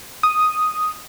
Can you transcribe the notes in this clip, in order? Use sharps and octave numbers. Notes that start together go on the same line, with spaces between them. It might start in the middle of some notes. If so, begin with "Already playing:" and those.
D#6